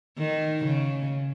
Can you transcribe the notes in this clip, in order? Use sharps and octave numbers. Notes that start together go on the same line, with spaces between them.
D#3
C#3